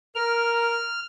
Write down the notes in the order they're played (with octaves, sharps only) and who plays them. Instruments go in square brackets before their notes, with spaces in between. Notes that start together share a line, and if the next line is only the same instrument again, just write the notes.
[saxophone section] A#4 [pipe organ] F6